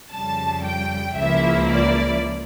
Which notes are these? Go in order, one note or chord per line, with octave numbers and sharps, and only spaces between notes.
F2 C#3 G3 A5
G5
C#2 C#3 F3 A#3 E4 E5
D5